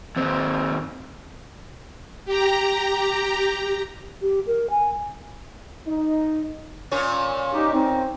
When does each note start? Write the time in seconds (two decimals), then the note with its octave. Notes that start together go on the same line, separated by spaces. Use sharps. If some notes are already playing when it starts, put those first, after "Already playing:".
0.16 D#2 C4
2.25 G4 A#5
4.22 G4
4.47 A#4
4.70 G#5
5.87 D#4
6.91 A#2 C#4 C#5
7.53 D#4 G4
7.73 C4 D#4